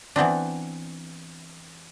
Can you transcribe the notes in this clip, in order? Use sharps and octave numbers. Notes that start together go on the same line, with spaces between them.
E3 B3 C4 D4